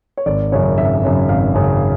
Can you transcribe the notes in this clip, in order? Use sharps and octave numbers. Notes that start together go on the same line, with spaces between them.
C#5
G#1 D5
F#2 C#3 C#5
G#1 E5
F#2 C#3
G#1 F5
F#2 C#3